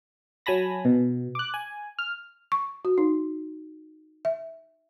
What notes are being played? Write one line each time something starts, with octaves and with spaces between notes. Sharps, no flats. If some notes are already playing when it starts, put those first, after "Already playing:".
F#3 G#5 A5 B5 A#6
B2
D6 F#6
G#5
F6
C#6
F#4
D#4
E5